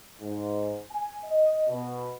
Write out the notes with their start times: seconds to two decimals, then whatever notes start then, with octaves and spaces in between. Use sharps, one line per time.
0.21 G#2
0.91 G#5
1.25 D#5
1.68 B2